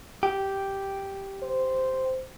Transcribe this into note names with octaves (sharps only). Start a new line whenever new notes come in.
G4
C5